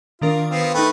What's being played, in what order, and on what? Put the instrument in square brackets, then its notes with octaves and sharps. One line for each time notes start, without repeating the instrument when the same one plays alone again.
[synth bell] D#3 D4 A#4 [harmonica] F4
[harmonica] B3 C4 F4
[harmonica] A3 B4 [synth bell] D#4 G5